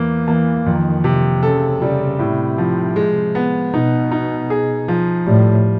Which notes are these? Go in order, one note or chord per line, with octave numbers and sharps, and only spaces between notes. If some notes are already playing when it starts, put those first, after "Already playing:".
Already playing: E2 A#3
E3 A#3
F2 D#3
C3
C#3 A4
C#3 G3
A2 C3
F3
G#3
B3
B2 D#4
D#4
G#4
F3
A2 G3